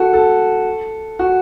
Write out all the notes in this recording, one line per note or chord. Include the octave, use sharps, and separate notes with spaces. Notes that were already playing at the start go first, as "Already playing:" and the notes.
Already playing: F#4 A4
A4
F#4